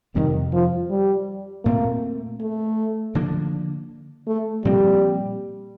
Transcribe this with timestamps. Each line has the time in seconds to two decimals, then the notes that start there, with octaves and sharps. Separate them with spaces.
0.15 F2 C3 D#3 G3 C4
0.53 F3
0.90 G3
1.65 A#2 A3 A#3 C4
2.41 A3
3.15 D3 F3 A#3 D4
4.27 A3
4.64 A#2 F3 G3 C4